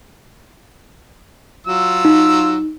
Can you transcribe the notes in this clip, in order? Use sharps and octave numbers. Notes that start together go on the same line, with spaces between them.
F#3 F4 E6
D#4